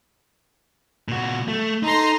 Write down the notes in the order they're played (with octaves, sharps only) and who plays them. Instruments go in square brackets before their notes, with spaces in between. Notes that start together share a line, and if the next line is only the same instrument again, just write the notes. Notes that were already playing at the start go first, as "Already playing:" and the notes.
[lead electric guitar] A#2 F#4
A3
[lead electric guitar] D#4 [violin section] A4 A#5 C6